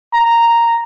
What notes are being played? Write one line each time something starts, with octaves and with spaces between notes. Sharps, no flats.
A#5